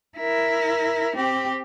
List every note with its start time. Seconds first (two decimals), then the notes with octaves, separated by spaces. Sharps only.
0.18 E4 A#4
1.16 C4 G4